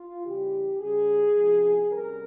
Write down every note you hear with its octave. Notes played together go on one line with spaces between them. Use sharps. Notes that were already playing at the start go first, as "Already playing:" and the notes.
Already playing: F4
C#3 E3 G3 G4
C#3 G3 C#4 G#4
C3 F3 G#3 C#4
C3 G3 C#4 A#4